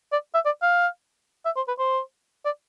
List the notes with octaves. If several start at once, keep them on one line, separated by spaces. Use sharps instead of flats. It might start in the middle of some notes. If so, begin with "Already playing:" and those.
D5
E5
D5
F5
E5
C5
B4
C5
D5